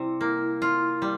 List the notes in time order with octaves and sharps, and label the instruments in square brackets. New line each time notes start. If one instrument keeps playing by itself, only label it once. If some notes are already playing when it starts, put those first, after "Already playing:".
Already playing: [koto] C3 G3 [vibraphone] E4
[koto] A#3
F4
G3